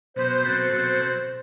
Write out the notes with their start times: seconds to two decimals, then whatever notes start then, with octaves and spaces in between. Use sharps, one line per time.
0.16 B2 F#3 B3 C5
0.45 B2 F#3 C4 F#4 A4
0.73 B2 F#3 C4 F#4 A4 C5